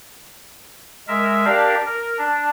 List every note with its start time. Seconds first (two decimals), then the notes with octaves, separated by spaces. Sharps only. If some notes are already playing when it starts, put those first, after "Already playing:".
1.08 G#3 A#4 E5
1.45 D4 G4 A#4 D5 F5
1.86 A#4
2.18 D4